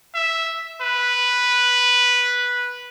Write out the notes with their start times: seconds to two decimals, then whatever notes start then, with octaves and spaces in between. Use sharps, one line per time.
0.15 E5
0.81 B4